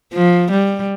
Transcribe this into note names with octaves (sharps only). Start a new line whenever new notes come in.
F3
G3